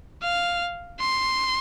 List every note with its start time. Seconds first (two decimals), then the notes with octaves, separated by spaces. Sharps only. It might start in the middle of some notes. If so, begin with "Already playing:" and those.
0.23 F5
1.00 C6